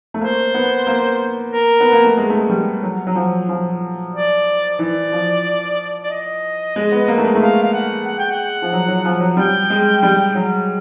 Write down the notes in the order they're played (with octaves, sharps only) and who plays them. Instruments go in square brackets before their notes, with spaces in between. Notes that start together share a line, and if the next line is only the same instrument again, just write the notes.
[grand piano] A3
[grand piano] A#3 [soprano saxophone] C5
[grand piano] B3
A#3
[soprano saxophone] A#4
[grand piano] B3
A#3
A3
G#3
A3
G#3
G3
F#3
F#3
F3
F3
[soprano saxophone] D5
[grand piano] E3 [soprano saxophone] D5
[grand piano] F3
[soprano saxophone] D5
D#5
[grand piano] G#3
B3
A#3
A3
G#3
A3
[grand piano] G#3 [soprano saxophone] F5
[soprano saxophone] F5
F#5
F#5
G5
F#5
[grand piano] F3
F#3
F#3
F3
F#3
[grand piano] G3 [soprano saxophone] G5
[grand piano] G#3
G3
F#3